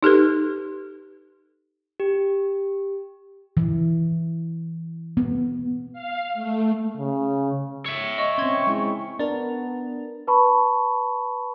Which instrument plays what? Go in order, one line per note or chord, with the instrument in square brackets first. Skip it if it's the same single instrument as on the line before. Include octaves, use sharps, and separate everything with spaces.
[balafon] D#4 G4 A4 B4
[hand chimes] G4
[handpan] E3
B3
[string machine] F5
A3
[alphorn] C#3
[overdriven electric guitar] C#5 E5
[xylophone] D#5 [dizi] C#6
[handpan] C4 C#4 [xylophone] C6 G#6
[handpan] G#3 E4
[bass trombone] B3 [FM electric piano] D4 A#4
[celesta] B4 A5 B5 C#6